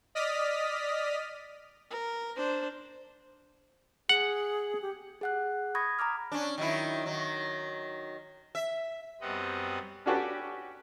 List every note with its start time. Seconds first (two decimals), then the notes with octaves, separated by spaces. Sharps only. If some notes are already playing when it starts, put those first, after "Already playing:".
0.15 D5 D#5 D#6 F6 B6
1.90 A#4
2.36 D4 C5
4.09 G#4 F#5
4.82 G4
5.21 G#4 F#5 F#6
5.75 B5 C#6 D#6 G#6 A#6
5.99 A#5 B5 D6 F6
6.32 C#4 D4
6.58 D#3 F#3 E4
7.06 D#3 F#3
8.55 E5
9.21 F#2 G3 B3 C4 D#5 F#5
10.06 C#4 D4 F#4 G4 A4 B4